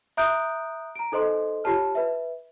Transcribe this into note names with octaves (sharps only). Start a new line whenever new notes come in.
E5 A#5 D#6 F#6 G6 D7
A#5 D7
D#4 A4 C5 D#5 C6
F4 G4 C#5 A5 F6
B4 E5